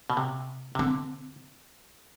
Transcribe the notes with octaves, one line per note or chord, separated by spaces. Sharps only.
B2
C3
C3
D3 C4